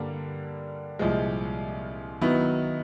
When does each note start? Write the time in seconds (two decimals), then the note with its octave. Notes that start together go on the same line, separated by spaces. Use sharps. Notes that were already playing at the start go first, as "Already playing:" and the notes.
Already playing: G2 D3 G3 A#3 D4
0.99 C2 A#2 F3 G#3
2.21 D#3 F#3 B3 E4